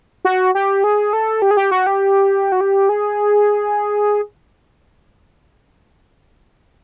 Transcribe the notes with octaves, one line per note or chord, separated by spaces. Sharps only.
F#4
G4
G#4
A4
G4
G#4
G4
F#4
G4
F#4
G4
G#4